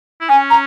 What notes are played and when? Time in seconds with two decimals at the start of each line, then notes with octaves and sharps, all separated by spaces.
0.21 E4
0.29 C#4 G#5
0.51 A#5